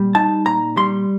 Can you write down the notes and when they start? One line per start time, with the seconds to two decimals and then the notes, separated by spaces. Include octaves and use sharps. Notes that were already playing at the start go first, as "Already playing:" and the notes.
Already playing: A#2 G3
0.15 D#4 A5
0.46 A#2 A#5
0.77 G3 C6